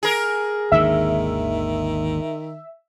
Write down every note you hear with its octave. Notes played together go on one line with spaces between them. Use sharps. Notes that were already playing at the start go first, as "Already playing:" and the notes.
G#4 A#4
G#1 D#2 D3 D#3 E5